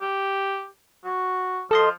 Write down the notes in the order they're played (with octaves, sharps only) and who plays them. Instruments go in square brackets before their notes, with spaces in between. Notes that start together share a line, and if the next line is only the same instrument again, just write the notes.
[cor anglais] G4
F#4
[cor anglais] F3 [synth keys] A4 D#5 C6